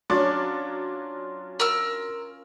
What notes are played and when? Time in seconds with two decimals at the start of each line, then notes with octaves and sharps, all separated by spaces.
0.10 F#3 C#4 D4 F4 D6
1.60 A#4 E6 F6